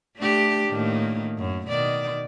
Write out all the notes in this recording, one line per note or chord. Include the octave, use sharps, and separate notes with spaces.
A3 D4 G4
A2 D#3 A#3
F#2
B2 D#3 D5